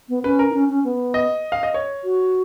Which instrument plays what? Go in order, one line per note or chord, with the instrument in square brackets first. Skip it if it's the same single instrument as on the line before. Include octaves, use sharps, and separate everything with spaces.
[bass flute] B3
[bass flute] C#4 [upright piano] B4
[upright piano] A#4
[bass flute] D#4
C#4
C#4
B3
[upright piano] D#5
F5
D#5
C#5
[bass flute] F#4